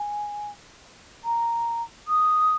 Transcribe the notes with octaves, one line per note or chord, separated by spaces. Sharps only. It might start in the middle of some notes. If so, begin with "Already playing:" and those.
Already playing: G#5
A#5
D#6